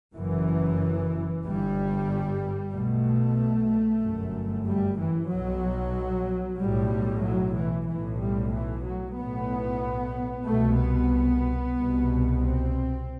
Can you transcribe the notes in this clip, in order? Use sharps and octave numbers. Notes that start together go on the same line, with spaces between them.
F#1 F#2 E3
G1 G2 G3
B1 B2 A3
G1 F#2
G3
E3
B1 B2 F#3
B1 A2 G3
F#3
E3
B1 A2 E3
G3
E3
F#3
B1 A2 B3
C2 B2 A3
B3
C2 B2
C4